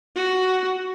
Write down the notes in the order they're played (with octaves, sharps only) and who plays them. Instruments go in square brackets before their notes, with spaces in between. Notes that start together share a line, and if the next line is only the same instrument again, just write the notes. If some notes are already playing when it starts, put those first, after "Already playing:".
[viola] F#4